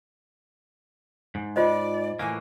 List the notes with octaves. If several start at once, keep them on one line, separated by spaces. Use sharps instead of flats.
G#2
F4 C5 D5 D#5
A2 E3 A#3 G#5